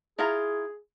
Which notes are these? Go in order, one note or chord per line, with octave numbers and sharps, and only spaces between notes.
E4 F4 G#4 A#5